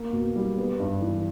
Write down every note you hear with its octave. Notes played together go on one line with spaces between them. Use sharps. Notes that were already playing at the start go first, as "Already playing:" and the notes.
Already playing: A#3
B2
G3
B3
G2
E3